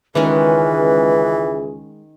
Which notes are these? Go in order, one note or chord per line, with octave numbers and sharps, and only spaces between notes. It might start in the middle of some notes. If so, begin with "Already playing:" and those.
C#2 D#3 E3 G#3 C#4 G#4 B4